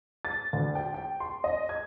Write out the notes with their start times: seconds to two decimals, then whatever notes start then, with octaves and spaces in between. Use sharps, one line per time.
0.25 A6
0.53 D2
0.75 G5
0.94 G5
1.20 C6
1.44 D#5
1.69 G#6